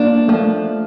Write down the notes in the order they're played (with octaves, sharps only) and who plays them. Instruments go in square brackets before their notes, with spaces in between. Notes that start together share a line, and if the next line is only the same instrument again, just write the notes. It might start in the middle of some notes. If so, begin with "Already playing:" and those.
Already playing: [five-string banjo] F3 D4 [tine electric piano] A#3
[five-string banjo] F3 [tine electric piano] A3